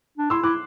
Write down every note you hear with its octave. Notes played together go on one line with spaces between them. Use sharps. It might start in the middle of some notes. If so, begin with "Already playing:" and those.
D4
E4 C6 E6
E4 D6 F#6